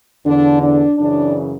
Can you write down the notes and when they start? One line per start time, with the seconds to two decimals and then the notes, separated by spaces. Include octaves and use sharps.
0.24 E2 D3 D4
0.61 D4
0.98 F#2 C#3 E3 D4